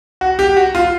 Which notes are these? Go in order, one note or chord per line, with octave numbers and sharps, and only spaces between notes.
F#4
G4
F#4
F4